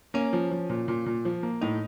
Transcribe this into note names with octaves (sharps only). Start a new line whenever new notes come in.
A#3 C#4
F3
F3
A#2
A#2
A#2
F3
A#3
A2 D#4